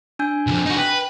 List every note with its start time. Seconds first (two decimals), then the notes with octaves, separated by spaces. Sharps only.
0.19 D4 G#5 G6
0.47 C2 F2
0.66 D#4 F#4
0.78 B4 G5